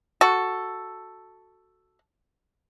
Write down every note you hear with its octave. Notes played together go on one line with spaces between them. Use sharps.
F#4 A4